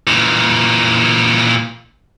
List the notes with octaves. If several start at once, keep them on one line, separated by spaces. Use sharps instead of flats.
A#2 E3